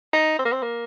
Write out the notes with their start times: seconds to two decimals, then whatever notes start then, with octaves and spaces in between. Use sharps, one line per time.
0.13 D#4
0.39 C4
0.45 A#3
0.53 C4
0.63 A#3